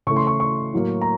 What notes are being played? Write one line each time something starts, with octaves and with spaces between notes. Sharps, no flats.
C#3 E3 A3 C#6
C6
C#6
C#6
A2 F#3 A#3
A#5